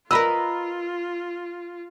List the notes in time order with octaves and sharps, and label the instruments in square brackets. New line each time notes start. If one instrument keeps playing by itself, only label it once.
[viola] F4 [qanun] A#4 B4 D#5 [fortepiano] B5 E6